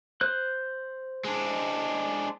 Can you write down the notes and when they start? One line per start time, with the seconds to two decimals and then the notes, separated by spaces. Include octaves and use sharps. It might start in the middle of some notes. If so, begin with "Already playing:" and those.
0.21 C5 F#6
1.24 G#3 D4